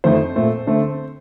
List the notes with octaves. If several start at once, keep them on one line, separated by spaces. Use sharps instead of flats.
F2 D#3 A3 C5
A#2 A3 C4
D3 A3 C4